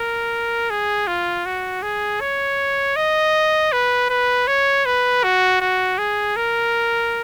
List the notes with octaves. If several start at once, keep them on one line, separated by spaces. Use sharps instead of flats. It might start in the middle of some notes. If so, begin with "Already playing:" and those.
Already playing: A#4
G#4
F4
F#4
G#4
C#5
D#5
B4
B4
C#5
B4
F#4
F#4
G#4
A#4